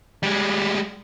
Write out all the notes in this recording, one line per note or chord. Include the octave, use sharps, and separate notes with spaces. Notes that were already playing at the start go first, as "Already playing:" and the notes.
G3 G#3